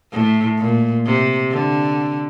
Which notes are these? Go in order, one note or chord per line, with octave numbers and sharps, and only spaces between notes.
A2
A#2
C3
D3